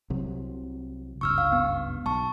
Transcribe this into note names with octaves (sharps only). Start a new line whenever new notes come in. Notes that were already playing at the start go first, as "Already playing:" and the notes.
C2 C3 F#3
F#1 C#2 G2 C#6 E6 F6
F5
B3
B1 A5 C#6